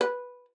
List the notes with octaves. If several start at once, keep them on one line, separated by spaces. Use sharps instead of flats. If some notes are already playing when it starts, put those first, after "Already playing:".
B4